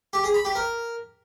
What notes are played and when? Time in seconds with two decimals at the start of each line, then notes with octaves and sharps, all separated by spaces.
0.13 G4
0.24 G#4
0.34 B5
0.45 G4
0.55 A#4